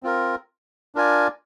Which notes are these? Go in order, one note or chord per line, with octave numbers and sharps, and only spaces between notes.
C4 F4 A#4
D4 F4 A#4 D5 G#5